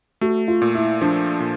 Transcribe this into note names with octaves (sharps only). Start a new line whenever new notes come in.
A3 F#4
F4
A#2
E4
F3 D4
A#2